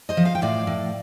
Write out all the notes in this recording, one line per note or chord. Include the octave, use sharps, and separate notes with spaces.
C5 D#5
F3
F5
G5
A2 D5 F5
A2